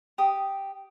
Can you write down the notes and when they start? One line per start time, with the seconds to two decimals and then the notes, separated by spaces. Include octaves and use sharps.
0.18 G4 D#6